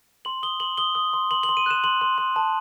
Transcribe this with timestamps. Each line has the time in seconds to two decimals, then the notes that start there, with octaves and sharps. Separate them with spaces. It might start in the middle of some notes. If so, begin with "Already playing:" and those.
0.25 C6 F#7
0.43 D#6 G7
0.60 C6 F#7
0.78 D#6 G7
0.95 D#6
1.13 C6
1.31 C6 F#7
1.43 F#7
1.49 C6
1.57 D#7
1.66 F#6 E7
1.84 C6 F#7
2.01 C6
2.18 C6
2.36 A5